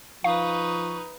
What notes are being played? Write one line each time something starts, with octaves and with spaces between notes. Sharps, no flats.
F3 D#4 B4 F5 C#6